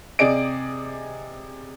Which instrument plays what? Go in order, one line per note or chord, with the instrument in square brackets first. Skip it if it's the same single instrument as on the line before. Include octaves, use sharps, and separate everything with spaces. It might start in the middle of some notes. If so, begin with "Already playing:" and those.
[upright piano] C3 G#4 D5 D#5 D7